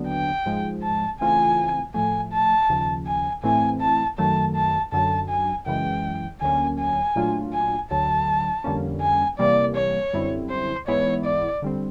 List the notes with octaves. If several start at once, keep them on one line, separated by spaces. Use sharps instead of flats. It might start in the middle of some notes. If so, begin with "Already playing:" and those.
Already playing: D#2 D3 F#3 B3 D4
G5
G#2 F3 G#3
A5
C#3 E3 A3 C4 F4 G#5
A2 F3 A3 G#5
A5
D#2 C#3 F3
G#5
A2 E3 A3 C4 E4 G#5
A5
F#2 D#3 F#3 A3 A5
A5
F#2 D3 F#3 A5
G#5
F#2 C#3 E3 G#3 G5
D2 D3 F#3 A#3 C#4 G#5
G#5
A#2 F#3 A3 D4 F4
G#5
D2 D3 F#3 A5
F2 D3 G3 A#3 C#4
G#5
C3 E3 G3 A#3 D5
C#5
F#2 D3 G3 C4 E4
C5
G#2 E3 G#3 B3 E4 C#5
D5
D3 G3 C4